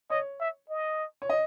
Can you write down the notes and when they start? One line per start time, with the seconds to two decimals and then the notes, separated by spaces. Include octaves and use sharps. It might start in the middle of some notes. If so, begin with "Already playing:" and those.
0.10 C#5 D#5
0.40 E5
0.70 D#5
1.22 C#5
1.29 D#5